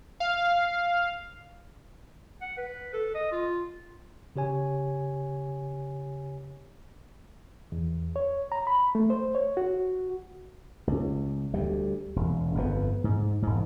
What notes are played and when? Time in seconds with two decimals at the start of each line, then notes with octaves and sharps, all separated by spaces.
0.20 F5
2.41 F#5
2.57 B4
2.93 A4
3.15 D#5
3.31 F4
4.36 C#3 G4 C#5 G#5
7.72 E2
8.16 C#5
8.52 A#5
8.67 B5
8.95 A3
9.10 C5
9.35 C#5
9.57 F#4
10.87 C#2
11.54 D2 G3
12.16 E1
12.55 G1 F2 B3
13.04 G#2
13.42 E1 G#2